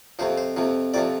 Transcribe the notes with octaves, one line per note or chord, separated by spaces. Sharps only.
F2 C3 F3 C5
C5
F2 C3 F3
F2 C3 F3 D5